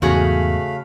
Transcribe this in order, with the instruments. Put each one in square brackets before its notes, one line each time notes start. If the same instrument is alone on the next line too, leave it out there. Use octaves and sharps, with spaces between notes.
[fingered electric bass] E2 G#2 [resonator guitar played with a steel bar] C#3 F#4 G#4 [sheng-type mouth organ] A3 F5 B5